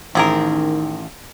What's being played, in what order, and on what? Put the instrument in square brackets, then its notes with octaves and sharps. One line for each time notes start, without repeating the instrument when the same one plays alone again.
[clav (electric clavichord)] A1 [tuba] D#3 [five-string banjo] C4 G#4 A#4